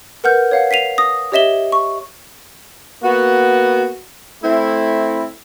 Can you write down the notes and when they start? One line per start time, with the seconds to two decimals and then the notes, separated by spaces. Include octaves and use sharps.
0.24 A#4 B4 F#5 F6 G6
0.51 C#5 F5 F#5
0.71 B6 C7 D#7 F7
0.98 D#6 A#6
1.32 G4 C#5 D#5 E5 E7 G7
1.72 C#6
3.03 A#3 B3 F#4
4.43 A3 C4 E4